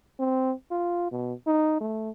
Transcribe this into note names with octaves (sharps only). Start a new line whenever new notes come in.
C4
F4
B2
D#4
A3